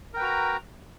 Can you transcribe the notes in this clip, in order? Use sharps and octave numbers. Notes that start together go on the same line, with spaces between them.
F#4 A#4 B4 G5 A#5